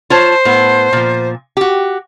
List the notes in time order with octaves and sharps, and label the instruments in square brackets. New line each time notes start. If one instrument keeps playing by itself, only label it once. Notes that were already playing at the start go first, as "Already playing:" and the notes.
[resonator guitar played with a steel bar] F4 C#5 A5 [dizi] C5
[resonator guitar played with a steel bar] A2 B3
A#2 F3
F#4 G4